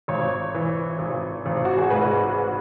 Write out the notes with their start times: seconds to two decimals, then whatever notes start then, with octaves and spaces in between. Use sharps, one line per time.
0.08 G#1 C#5
0.54 E3
0.99 G#1
1.46 G#1
1.65 F#4
1.78 G#4
1.90 G#2 B4